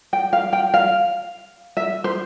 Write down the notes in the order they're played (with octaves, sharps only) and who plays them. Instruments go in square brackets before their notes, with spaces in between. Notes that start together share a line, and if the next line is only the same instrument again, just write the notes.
[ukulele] G5
F5
G5
F5
E5
C5